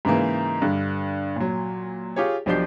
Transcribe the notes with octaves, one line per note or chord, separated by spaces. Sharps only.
G#2 C#3 E3 A#3
G2 D3
A#2 F#3
F4 G4 G#4 C#5
B1 F3 D4 G4 G6 C7